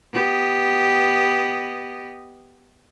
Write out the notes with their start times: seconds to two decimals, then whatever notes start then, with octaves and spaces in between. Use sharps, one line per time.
0.13 B3 G4 D#5